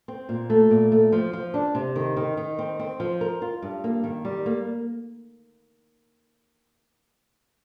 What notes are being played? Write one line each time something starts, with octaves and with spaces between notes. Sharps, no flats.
C4
A#2
A3
A#2
A3
F3
F3
D4
C3
D#3
D#3
D#3
C4
C4
F3
A#4
F4
G2
A#3
D#3
G3
A#3